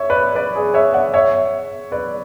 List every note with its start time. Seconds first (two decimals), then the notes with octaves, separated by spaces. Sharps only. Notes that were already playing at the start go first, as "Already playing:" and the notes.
Already playing: C#5 E5
0.10 B4 D5
0.35 B4 D5
0.56 G#4
0.74 C#5 E5
0.94 D5 F#5
1.14 C#5 E5
1.92 B4 D5